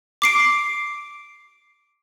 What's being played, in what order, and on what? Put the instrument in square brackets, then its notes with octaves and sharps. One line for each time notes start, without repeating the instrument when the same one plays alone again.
[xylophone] D6 C7 D7